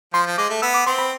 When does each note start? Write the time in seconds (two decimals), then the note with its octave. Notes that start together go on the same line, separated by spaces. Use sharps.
0.14 F3 C6
0.26 F3
0.38 G#3 D6
0.50 A3
0.62 B3 E6
0.74 D6
0.87 C4 C6
0.99 B5